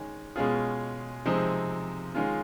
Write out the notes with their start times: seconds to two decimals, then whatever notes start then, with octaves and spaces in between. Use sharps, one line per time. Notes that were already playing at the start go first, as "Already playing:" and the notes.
Already playing: D#3 G#3 C#4
0.36 B2 G#3 C#4 F4 G#4
1.25 C3 F3 G#3 C4 D#4
2.15 D#3 G#3 C#4 F4